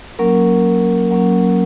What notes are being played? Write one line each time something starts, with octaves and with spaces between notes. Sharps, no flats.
F#3 A#3 C#4 A#4
F#3 A#3 C#4